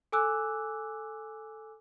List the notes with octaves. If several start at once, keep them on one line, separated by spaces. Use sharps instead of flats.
A4 G#5 D6 E6 F#6